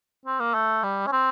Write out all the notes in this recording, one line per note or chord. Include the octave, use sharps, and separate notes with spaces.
C4
A#3
A3
G3
C#4
C4